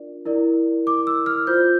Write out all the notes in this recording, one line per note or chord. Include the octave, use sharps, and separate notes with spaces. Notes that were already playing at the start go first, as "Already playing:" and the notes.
Already playing: D4 F4 A#4 D5
E4 A#4 D5
D6
E6
F6
F4 C5 G6